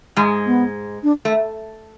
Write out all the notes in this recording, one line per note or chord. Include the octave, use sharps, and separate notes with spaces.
G#2 G#3
B3
D4
A3